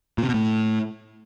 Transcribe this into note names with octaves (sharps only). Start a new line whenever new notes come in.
A#2
C3
B2
A2